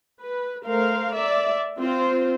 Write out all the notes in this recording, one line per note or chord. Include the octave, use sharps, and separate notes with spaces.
B4
A3 A#4 C5 F5
D5 E5
C4 F4 C5